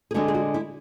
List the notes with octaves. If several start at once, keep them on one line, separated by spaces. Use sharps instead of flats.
G#4
D3 G#3 D4 F#4
G#4
F#4
E4